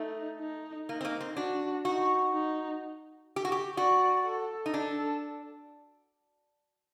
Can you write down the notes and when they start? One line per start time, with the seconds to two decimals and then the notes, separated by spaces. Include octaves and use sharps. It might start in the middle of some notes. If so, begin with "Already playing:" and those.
Already playing: A3 D#4
0.40 D#4
0.88 A#3 D#4
1.01 C4
1.05 A#3
1.21 C4
1.36 D4 F#4
1.85 D#4 F#4
2.33 D#4
3.36 G4
3.45 F#4
3.52 G4
3.77 F#4 D5
4.25 A4
4.66 D#4
4.74 D4 A4